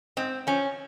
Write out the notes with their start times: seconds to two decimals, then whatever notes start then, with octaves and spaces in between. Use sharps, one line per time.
0.17 G#2 C4
0.47 F3 C#4